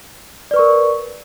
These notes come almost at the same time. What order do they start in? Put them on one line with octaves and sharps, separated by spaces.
D5 B4 C#6 A#4